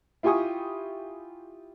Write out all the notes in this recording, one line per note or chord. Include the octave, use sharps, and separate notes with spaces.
E4 F4 G4 G#5 C#6 D#6